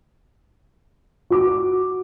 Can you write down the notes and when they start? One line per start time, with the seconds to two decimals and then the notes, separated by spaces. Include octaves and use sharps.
1.30 F#4 D6